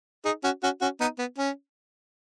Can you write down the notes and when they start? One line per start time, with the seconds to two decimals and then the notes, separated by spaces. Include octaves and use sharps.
0.25 D#4 G#4
0.44 C#4 F#4
0.63 C#4 F#4
0.81 C#4 F#4
1.00 B3 D#4
1.19 B3
1.38 C#4